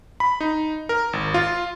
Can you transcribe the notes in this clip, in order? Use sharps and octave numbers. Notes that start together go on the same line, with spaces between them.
B5
D#4
A#4
G#1
F4